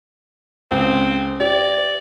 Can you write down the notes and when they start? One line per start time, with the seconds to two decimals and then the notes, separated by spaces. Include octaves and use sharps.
0.71 C#2 C4
1.40 G4 D5